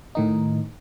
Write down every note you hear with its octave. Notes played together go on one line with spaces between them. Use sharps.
A2 D#3 D#4